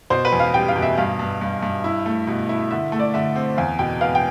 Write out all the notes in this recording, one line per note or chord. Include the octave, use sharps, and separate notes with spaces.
B2 C5
B4
E2
F5
G3 G5
F5
B2
E5
G2 F5
G2
G2
G2
E4
A3
B2
E4
D3 E5
A3
D5
D3 E5
C4
E2 F5
B2 G5
B3 F5
G5